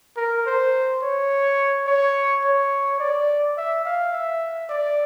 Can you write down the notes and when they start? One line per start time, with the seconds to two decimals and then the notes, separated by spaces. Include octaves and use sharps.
0.17 A#4
0.46 C5
1.03 C#5
1.87 C#5
2.44 C#5
3.00 D5
3.57 E5
3.85 F5
4.13 E5
4.70 D5